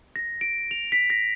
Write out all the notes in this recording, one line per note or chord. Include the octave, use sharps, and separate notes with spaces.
A#6
D7
F7
B6
A#6